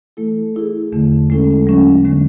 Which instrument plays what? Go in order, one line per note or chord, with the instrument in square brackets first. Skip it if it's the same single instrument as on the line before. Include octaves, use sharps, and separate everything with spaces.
[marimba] E3 A3 E4 A4
A3 E4 G#4
E2 D3 A3
G#3 C#4 E4 A4
F#3 A3 C#4
D3 G#3 B3 D4